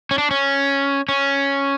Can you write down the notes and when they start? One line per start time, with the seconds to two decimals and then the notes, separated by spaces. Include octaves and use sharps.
0.11 C#4
0.18 D4
0.31 C#4
1.09 C#4